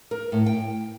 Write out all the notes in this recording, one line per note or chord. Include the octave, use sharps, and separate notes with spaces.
A#4
A2
G5